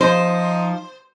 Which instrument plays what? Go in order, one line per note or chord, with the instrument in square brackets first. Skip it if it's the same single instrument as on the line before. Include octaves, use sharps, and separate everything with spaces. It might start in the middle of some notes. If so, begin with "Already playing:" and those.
[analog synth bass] F3 [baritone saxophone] D#4 [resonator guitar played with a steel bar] C5